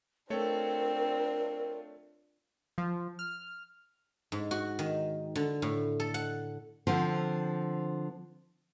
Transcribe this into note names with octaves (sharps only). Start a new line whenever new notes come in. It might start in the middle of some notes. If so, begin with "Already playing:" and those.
A3 C4 D4 F4 A4 A#4 C#5
F3
F6
G#2
F#4
D#3
D3
A2
A4
F#5
D3 F3 C4